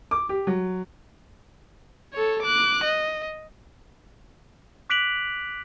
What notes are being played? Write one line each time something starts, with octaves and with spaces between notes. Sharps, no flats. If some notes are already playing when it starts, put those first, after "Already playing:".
D6
G4
F#3
A4 C#5
D6 F#6
D#5
D6 F#6 B6 D7 F7 F#7